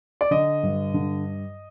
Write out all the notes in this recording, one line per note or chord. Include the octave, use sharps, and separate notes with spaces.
D5
D3 D#5
G2
D3